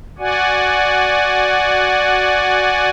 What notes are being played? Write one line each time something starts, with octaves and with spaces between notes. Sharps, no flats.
F#4 D5 F#5 G#5